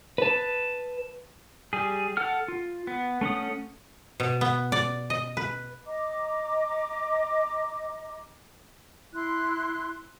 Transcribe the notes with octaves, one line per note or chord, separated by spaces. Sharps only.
B4 A5
G3 G#4
A4 F#5 F6
F4
B3
A3 C#4 F#5 D#6
B2
B3
D5
D#5
B4
D#5 A#5 D6
E4 C6 F#6